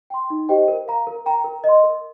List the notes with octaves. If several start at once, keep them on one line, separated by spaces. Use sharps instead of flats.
G5 C6
D#4
G4 C5 D#5 G5
A#4
F5 A#5
A#4
G5 A#5
A#4
D#5
C6
A#4